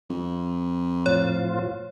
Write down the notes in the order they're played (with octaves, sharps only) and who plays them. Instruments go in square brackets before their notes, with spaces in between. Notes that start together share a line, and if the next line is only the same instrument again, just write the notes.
[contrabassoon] F2
[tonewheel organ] A2 F3 F4 [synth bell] C#5